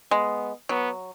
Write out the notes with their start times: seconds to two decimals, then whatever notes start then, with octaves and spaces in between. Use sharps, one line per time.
0.11 G#3 B3
0.69 F#3 B3